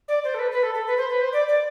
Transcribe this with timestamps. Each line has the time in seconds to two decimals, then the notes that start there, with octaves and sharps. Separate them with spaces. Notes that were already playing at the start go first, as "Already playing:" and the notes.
0.08 D5
0.24 C5
0.34 A4
0.39 B4
0.52 B4
0.63 A4
0.74 A4
0.86 B4
0.97 C5
1.09 B4
1.21 C5
1.33 D5
1.48 D5